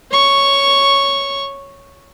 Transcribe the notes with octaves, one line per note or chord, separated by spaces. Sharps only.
C#5 C#6